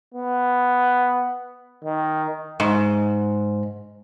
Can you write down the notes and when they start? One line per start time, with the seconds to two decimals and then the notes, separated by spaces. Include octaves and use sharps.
0.14 B3
1.84 D#3
2.60 G#2